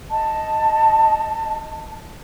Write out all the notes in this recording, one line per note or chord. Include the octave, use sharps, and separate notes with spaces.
D#5 A5